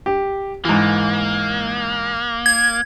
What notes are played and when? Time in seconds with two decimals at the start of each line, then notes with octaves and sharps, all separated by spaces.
0.06 G4
0.65 G#2 E3 A#3
2.46 G#6